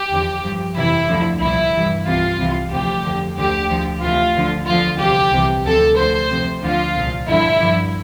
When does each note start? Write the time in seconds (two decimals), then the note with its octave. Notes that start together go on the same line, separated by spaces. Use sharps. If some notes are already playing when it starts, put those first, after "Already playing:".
Already playing: G4
0.09 E2 D3 F3
0.42 G2 F3
0.74 F2 C3 E3 E4
1.08 D2 D3 F3
1.39 C2 A#2 F3 E4
1.73 G2 E3
2.05 C2 C3 E3 F4
2.38 C2 C3 E3
2.70 D2 C3 F3 G4
3.03 F2 D3 F3
3.36 D2 D3 F3 G4
3.68 D2 D3 F3
4.01 D2 C3 E3 F4
4.34 D2 D3 F3
4.66 E2 D3 F3 F4
4.99 C2 C3 F3 G4
5.31 C2 C3 E3
5.64 D2 C3 F3 A4
5.96 D2 D3 F3 C5
6.29 F2 C3 F3
6.62 D2 D3 F3 F4
6.94 C2 A#2 F3
7.27 G2 D3 F3 E4
7.60 G2 D3 F3